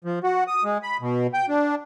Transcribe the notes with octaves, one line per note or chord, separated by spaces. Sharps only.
F3
F#4
D#6
G#3
B5
B2
G5
D4